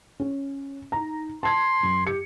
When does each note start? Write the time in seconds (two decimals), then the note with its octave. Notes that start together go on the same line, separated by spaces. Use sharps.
0.20 C#4
0.92 D#4 A#5
1.43 A5 C6 G#6
1.83 F#2
2.07 G4 C#7